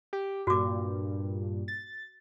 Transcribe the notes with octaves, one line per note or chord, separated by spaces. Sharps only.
G4
G2 A#2 F#4 D6
A6